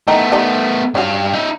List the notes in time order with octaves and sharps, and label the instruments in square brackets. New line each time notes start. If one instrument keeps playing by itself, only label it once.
[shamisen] D#3 E3 D#4 [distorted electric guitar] A3 B3
[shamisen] G3 D#4 B5
[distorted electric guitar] G2 F5 [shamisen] C#4 F#4
[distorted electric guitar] D#4 E5